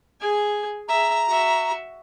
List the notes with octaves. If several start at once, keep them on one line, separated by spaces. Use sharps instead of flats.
G#4 G#5
G#4 E5 A#5
F#4 E5